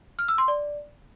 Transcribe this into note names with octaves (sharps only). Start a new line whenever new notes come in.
F6
E6
C6
D5